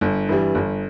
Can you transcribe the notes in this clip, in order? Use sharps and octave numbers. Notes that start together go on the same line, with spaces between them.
G1
G2 E3 G3
G1